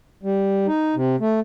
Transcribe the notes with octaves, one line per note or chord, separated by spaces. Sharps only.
G3
D#4
C3
A3